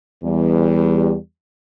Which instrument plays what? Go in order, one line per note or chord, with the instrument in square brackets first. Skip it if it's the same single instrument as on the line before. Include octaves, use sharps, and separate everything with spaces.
[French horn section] E2 G3